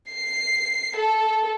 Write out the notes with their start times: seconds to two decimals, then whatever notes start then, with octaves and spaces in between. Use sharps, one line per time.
0.12 C7
0.97 A4